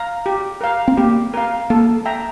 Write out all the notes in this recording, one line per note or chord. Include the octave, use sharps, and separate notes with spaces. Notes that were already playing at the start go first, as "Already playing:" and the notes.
Already playing: F5 A#5
G4
A#4 F5
C4
A#3 G4
A#4 F5
A#3 A4
E5 G5 A#5